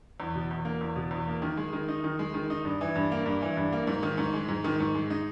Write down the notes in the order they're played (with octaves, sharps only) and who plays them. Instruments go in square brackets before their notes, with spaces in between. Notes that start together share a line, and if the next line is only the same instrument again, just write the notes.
[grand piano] E2
B2
E2
A#3
E2
B2
E2
A#3
D#3
G#3
D#3
D#4
D#3
G#3
D#3
D#4
G2
E3
G2
A#3
G2
E3
G2
A#3
G#2
D#3
G#2
G#3
G#2
D#3
G#2
G#3
D#4